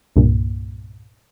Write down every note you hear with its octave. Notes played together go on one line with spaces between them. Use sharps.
C2 G2 A#2